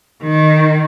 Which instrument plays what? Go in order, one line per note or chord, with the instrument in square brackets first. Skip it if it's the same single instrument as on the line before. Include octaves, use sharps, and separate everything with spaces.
[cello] D#3